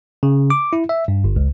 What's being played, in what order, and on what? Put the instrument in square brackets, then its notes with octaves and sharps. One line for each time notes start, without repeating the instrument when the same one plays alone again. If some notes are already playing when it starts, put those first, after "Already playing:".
[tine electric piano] C#3
D6
E4
E5
G2
G1
C#2